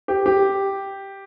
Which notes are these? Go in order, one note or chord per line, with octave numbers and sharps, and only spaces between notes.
G4
G4